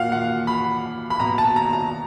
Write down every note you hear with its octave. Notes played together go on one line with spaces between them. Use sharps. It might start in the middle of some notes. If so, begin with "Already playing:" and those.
Already playing: A#2 F5 F#5
F#5
B5
B5
B2 A#5
A5
A#5
A#5